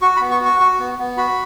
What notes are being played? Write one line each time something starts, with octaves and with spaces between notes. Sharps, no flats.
F#4 C#6
B5
B3
C#6
F#4 C#6
F#4
B3
B3
F#4 B5